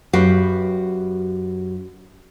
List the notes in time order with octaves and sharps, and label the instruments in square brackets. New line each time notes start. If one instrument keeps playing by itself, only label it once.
[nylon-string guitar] F#2 F#4 G4 B4 F5